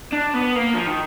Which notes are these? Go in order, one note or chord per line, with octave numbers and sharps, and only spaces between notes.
D4
B3
A#3
F3
D#3